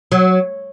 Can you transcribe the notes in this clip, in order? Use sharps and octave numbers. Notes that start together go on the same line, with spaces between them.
F#3